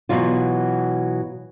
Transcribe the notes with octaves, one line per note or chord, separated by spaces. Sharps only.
B2 E3 F#3 F4